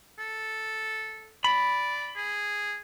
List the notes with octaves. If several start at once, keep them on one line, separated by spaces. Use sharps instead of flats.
A4
D5 B5
G#4